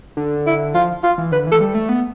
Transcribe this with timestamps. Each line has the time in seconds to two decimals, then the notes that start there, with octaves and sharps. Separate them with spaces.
0.17 D3
0.46 E4
0.74 F3 F4
1.03 F4
1.18 E3
1.32 D3 B4
1.47 E3 A4
1.61 G3
1.75 A3
1.89 B3